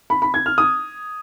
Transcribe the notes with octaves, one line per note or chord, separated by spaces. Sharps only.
B5
B5
G#6
F6
D#6